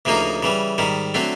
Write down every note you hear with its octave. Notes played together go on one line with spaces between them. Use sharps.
D2 C#3 F3 A#3 D#4
C#3 E3 G3
G#2 D#3 G3
D3 F#3 A3 C4